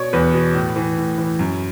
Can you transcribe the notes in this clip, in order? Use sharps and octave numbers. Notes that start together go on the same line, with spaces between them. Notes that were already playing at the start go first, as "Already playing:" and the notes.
Already playing: B2 C#5 D5
E2 B4
B2
A2
E3
A2
E3
F#2